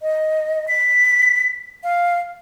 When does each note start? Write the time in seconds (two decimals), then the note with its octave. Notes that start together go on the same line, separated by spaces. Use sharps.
0.02 D#5
0.68 B6
1.84 F5